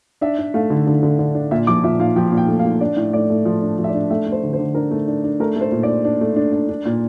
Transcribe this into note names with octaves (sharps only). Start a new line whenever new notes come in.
D4 E5
D4
A3 F5
D3
D3
D3
D3
D4
A#2 E5
F3 D6
A#2 E5
A#2 F5
F3 G5
A#2
G5
A3
F5
A#2
D4 D5
A2
A3 D5
A3
F3
D4
F3
E5
D5
D4
A3 E5
A3
C5
D3
C5
D3
D4 A#4
A3
D4
D4
A3 A#4
A3 C5
A#2
D5
D4
D4
A3
D4
D4
D4
A#2